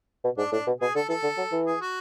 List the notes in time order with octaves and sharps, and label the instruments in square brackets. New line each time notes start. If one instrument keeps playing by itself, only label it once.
[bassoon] B2
[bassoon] G#2 [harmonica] D4
[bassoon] A2 [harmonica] D4
[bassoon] B2
[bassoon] B2 [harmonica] G#4
[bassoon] D3 [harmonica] A4
[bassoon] E3 [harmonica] A4
[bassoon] D3
F#3
E3
[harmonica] G#4
F#4